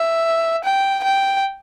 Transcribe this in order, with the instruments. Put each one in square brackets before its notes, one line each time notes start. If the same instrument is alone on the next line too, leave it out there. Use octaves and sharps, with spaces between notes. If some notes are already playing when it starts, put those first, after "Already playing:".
Already playing: [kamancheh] E5
G5
G5